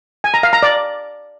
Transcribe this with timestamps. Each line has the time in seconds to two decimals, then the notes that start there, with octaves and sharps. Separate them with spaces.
0.24 G#5
0.34 A#5
0.43 F5
0.53 A#5
0.63 D5